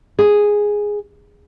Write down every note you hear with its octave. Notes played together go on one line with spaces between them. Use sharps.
G#4